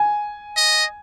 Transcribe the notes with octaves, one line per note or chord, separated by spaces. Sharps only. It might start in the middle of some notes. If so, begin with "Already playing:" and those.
Already playing: G#5
D#5